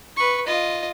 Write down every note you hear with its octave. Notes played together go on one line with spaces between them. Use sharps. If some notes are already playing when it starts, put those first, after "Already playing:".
B4 C#6
F4 D#5